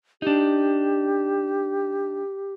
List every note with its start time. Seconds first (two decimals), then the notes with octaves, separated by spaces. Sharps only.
0.22 D4 D#4 G4